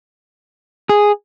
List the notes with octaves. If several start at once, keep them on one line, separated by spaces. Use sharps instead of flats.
G#4